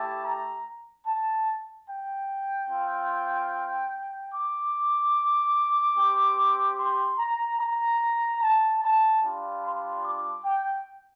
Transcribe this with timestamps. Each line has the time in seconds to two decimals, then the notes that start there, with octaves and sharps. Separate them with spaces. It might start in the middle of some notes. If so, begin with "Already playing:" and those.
Already playing: A3 E4 G4 A5
0.24 A#5
1.06 A5
1.88 G5
2.69 C4 F4
4.33 D6
5.96 C4 G4
6.78 C6
7.19 A#5
7.60 A#5
8.42 A5
8.83 A5
9.23 G3 D4 F4
9.63 C6
10.04 D6
10.45 G5